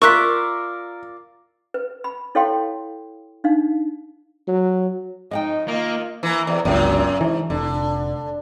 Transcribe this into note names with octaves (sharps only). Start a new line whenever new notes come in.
F4 A#4 D5 E5 C#6 F#6 B6
B4
B5
E4 A4 C#5 F5 G5 C6
D4 D#4 F5
F#3
F2 D#4 D#5 F#5 G5
D#3 A#3 D#4 F4
E3 A#3
E2 C3
G1 C#2 F#2 A#2
G#2 E3
F1 D3